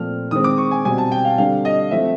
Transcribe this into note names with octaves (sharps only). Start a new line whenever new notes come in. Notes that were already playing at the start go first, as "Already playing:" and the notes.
Already playing: A#2 F3 A3 C4 F6
D#3 G#3 C4 D#6
D6
C#6
G#5
B2 G3 C4 G#5
A5
G5
F5
D3 G3 C4 F5
D#5
F3 A3 C4 E5